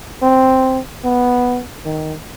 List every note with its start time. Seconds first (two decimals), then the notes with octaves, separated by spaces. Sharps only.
0.22 C4
1.04 B3
1.85 D#3